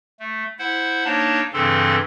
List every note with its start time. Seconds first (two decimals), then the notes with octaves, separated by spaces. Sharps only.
0.20 A3
0.59 E4 C5 F#5
1.05 A#3 D4 D#4 C#5 A5
1.53 G2 C#3 E3 C4 A4 C6